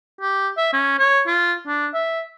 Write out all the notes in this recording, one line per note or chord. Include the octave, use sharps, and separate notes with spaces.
G4
E5
C#4
C#5
F4
D4
E5